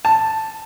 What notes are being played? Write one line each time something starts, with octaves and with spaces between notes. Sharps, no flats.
A5